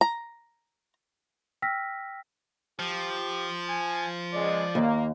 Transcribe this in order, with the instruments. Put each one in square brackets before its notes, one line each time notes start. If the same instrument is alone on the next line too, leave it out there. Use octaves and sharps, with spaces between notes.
[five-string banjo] A#5
[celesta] G5 E6 F6 A#6 B6
[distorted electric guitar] F3 [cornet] G4
[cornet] G#5
[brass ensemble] C#2 G#3 D#5 [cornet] D5
[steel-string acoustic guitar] D#2 [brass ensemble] A#3